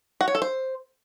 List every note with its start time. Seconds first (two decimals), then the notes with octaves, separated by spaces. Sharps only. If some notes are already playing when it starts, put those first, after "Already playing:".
0.21 F#4
0.28 C#5
0.35 A4
0.42 C5